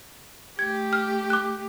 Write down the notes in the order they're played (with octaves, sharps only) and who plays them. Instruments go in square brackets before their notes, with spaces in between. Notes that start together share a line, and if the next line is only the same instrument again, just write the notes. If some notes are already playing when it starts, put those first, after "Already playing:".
[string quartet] A3 G4 [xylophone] G#6
[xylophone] F6
D6 F#6